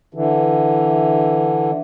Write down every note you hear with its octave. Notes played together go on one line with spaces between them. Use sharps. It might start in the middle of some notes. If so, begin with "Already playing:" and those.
D3 E3